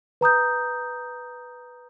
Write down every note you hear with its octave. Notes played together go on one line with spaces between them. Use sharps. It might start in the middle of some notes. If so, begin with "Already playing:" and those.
B4 A#5 D#6 G6